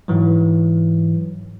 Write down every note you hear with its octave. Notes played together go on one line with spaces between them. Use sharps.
G#2 E3 F#3